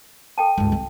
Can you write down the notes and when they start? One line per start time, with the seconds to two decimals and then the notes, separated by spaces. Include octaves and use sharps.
0.38 A4 G5 A5
0.58 C#2 G2
0.72 C4